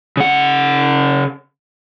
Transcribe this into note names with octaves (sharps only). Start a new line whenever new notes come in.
C#3 F#5